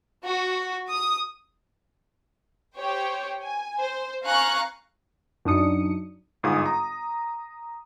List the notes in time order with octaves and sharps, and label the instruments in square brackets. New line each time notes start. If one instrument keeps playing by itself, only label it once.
[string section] F#4
D#6
[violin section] G4 C5 C#5 G5
G#5
C5
F5 G#5 A#5 C#6 F#6
[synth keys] F#2 D4 D#4 D#6 C#7
[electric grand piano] G1 G#2 F4 G#4 D#6
A#5